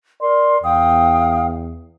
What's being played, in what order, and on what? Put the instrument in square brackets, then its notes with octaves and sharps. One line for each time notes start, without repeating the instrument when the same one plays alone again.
[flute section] A#4 C6 [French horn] D5
[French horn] E2 [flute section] F5 G5 D#6